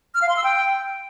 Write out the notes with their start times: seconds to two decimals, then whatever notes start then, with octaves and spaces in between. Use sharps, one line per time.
0.14 F6
0.22 F5
0.29 C6
0.37 E6
0.44 G5